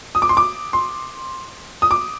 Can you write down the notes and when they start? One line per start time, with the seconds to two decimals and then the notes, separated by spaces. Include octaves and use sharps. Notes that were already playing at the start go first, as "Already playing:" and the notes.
0.15 D#6
0.22 D6
0.29 C6
0.37 D6
0.73 C6
1.82 D#6
1.91 D6